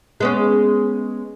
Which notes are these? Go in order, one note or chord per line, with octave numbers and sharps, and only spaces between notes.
G#3 B3 C#4